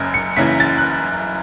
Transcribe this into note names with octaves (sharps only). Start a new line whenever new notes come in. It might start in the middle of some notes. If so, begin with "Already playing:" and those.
Already playing: F#1 F#2 C#3
C#7
F#1 F#2 C#3 E3 B6
A6
F#6